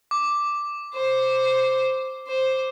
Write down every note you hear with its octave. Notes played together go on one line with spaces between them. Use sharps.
D6
C5
C5